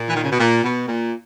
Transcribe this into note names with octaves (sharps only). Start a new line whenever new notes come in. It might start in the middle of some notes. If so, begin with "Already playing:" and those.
Already playing: A#2
E3
D#3
C#3
B2
A#2
B2
A#2